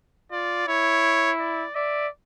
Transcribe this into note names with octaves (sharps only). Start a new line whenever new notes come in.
F4 D5
E4 C#5
D5
D5 E5